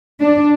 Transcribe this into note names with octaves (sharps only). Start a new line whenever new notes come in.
D4